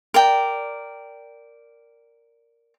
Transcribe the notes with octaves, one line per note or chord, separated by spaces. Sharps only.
A#4 D5 G5